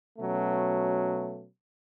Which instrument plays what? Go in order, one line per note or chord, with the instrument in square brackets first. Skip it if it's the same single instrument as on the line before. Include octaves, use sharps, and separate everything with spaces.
[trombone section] B2 F#3 A3 C#4